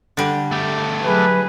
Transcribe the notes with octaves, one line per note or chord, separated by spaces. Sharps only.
D3 G3
A3 G4
F#3 G#4 B4